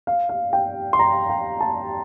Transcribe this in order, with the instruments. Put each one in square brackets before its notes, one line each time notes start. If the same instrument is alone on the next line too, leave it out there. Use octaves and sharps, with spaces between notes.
[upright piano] F5
F5
G5
C6
A#5
G5
A5